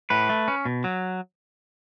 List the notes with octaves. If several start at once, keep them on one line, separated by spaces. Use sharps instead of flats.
A2 B4
A3
C#4
B2
F#3